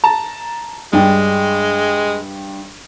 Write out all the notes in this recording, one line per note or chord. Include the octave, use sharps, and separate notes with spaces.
A5 A#5
G2 G#3 D4 G5